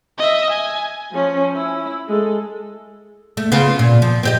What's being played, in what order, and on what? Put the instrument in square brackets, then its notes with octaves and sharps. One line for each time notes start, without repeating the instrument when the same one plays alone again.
[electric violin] D#5 E5
G#5
[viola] F3 C#4
E4
G#3 A4
[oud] A3
C#3 B3 F4
A#2
F3
C4 G4 D#5